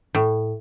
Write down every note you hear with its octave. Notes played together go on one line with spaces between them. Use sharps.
A2